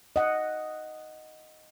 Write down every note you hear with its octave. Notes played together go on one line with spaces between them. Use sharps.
D#5 F#5